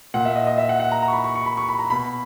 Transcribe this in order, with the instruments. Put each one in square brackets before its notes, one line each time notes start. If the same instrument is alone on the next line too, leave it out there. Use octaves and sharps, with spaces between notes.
[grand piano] A#2 F#5
E5
D#5
D#5
E5
F#5
F#5
A#5
A#5
C#6
B5
C#6
C#6
B5
C#6
B5
A#5
B2 B5